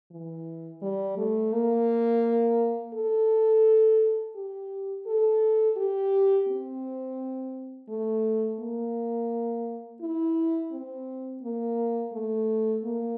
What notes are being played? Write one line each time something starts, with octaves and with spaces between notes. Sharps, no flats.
E3
G3
A3
A#3
A4
G4
A4
G4
C4
A3
A#3
E4
C4
A#3
A3
A#3